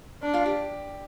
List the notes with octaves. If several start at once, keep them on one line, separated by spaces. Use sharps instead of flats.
D4
F4 F5
G4